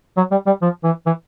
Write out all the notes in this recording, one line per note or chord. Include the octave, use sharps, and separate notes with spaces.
F#3
G3
G3
F3
E3
E3